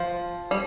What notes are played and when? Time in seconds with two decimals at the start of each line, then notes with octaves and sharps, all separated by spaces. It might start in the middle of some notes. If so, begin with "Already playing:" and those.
Already playing: F3
0.51 G3